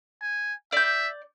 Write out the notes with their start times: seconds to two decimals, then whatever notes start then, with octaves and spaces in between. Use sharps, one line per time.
0.22 G#5
0.72 D5 E5 G6